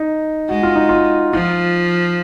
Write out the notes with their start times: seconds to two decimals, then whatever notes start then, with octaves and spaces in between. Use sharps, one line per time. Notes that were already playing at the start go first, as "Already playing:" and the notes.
Already playing: D#4
0.49 G#3 F#4
0.63 F4
0.76 D#4
0.89 F4
1.33 F3 F4